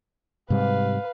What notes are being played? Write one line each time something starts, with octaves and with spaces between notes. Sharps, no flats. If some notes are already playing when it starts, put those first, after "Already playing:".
G#2 C3 G3 B4 F5